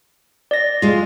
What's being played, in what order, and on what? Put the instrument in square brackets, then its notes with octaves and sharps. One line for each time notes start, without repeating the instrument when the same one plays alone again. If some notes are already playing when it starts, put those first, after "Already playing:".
[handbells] D5 A#6
[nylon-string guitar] G#3 F4